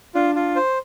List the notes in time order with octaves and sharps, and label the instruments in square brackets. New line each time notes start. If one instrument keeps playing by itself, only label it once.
[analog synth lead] D4 [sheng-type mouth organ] F4
[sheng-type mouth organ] F4
C5